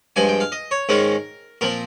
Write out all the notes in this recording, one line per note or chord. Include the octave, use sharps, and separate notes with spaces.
G2 F3 G#3 G#5
G5
F5
D#5
C#5
G#2 D#3 G#3 C#4 A#4
A#2 F3 C4 A#4